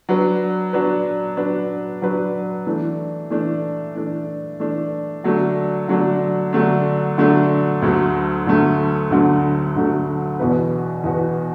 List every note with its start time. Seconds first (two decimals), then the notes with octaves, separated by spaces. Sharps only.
0.09 F#3 D4 B4
0.73 F#3 D4 B4
1.37 F#3 D4 B4
2.02 F#3 D4 B4
2.67 E3 A3 D4
3.30 E3 A3 D4
3.95 E3 A3 D4
4.60 E3 A3 D4
5.24 D3 F#3 A3 D4
5.88 D3 F#3 A3 D4
6.53 D3 F#3 A3 D4
7.18 D3 F#3 A3 D4
7.82 D2 D3 F#3 A3
8.47 D2 D3 F#3 A3
9.11 D2 D3 F#3 A3
9.76 D2 D3 F#3 A3
10.39 E2 B2 B3 F#4 B4
11.04 E2 B2 B3 F#4 B4